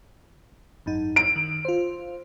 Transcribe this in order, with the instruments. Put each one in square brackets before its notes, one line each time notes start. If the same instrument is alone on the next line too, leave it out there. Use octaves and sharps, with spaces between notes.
[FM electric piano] G#1 F#2 D#4
[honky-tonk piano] D7
[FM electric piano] D#3
F4 C5